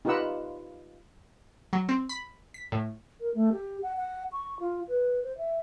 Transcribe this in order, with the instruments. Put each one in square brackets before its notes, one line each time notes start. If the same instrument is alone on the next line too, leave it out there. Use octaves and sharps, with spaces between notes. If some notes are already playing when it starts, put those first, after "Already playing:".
[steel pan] D#4 F4 G4 B4 F#5 E6
[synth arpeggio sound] F#3
C4
B5
B6
A2
[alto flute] A#4
A3
G4
F#5
F#5
C#6
F4
B4
C5
E5